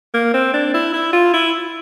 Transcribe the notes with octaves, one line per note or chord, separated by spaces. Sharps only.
A#3
C4
D4
E4
E4
F4
E4